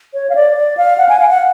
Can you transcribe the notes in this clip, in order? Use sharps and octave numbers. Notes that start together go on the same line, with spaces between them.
C#5
F5
D5
D5
F5
F#5
G#5
F5
F#5